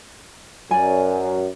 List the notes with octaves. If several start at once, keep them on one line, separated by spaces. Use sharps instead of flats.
F#2 D5 G#5